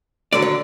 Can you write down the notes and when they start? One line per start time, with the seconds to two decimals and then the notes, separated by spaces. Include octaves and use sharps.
0.33 D#2 D3 F#3 D5
0.42 C#5